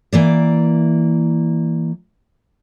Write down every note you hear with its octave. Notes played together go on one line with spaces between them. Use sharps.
E3 A#3 D5